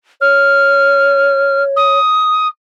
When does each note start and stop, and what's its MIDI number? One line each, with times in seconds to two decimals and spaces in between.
0.21 1.98 73
0.21 1.63 89
1.76 2.47 87